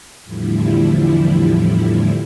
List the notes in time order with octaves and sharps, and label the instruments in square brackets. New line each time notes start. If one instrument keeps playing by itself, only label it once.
[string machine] E2 A2 D3 F3 G3 E4